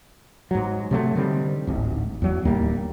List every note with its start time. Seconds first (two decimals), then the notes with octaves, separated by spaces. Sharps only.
0.51 G#2 F#3
0.91 C3 F#3 A3
1.15 D3 D#3 G3 C4
1.67 D1 G#1
2.22 E2 F#3
2.45 D1 D#2 G3 A#3